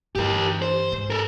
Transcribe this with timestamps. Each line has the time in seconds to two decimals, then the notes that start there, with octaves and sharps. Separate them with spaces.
0.15 G2 E3 G4 A#4
0.62 C5
0.92 G#2
1.10 A4 A#4